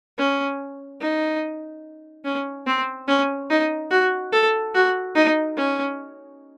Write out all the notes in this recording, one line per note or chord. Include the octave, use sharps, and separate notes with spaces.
C#4
D#4
C#4
C4
C#4
D#4
F#4
A4
F#4
D#4
C#4